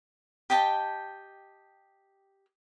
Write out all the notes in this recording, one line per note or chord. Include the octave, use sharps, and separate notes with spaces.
G4 D#5 G5 A5